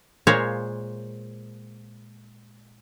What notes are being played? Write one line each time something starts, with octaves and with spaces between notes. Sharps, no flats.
A#2 G#3 C5 C#5 F5